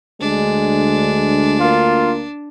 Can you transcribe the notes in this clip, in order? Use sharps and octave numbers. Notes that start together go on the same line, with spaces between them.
D2 G#3 D4
A#3 F4